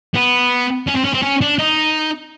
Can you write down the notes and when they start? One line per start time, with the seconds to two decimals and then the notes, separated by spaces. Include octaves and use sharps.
0.15 B3
0.87 C#4
0.95 C4
1.04 C#4
1.14 C4
1.22 C#4
1.41 D4
1.59 D#4